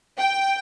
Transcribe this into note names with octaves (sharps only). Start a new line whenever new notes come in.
G5